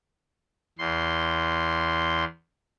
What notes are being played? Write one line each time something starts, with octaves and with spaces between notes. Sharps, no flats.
E2 C6